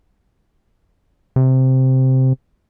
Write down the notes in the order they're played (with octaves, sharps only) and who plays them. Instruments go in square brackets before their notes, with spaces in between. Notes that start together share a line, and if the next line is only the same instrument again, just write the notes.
[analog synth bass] C3